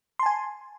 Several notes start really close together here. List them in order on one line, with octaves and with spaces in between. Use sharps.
C6 A5 G#5